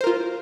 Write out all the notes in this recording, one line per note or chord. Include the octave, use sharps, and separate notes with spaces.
F4 A#4 C5